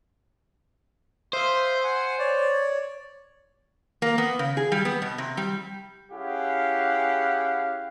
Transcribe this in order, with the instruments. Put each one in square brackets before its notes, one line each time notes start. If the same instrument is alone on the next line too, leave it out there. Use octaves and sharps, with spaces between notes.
[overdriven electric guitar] C5 [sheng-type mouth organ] E5 F5 D#6
[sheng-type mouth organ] F#5 G#5
C#5 D5
[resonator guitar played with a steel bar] A#3
B3
C#3
G#4
G3
B3
B2
C3
G3
[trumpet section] C#4 E4 G4 G#4 F5 F#5